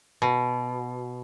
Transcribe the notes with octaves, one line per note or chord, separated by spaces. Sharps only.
B2